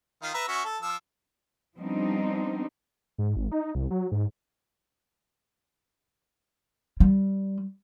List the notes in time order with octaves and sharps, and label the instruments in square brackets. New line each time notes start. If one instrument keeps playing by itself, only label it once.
[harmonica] D#3 F4
B4 E5 A#5
C#4 F#4 E5
A4
F3 E6
[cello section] F3 G3 B3 C4 D4 D#4
[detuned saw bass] G#2
G#1
D#4
C2
F#3
G#2
[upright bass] G3